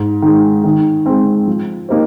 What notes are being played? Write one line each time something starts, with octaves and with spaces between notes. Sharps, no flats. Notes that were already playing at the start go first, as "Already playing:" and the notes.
Already playing: G#2
D#3 G#3
D#3
G#3 C4
F3
A#3 D#4 G4 C5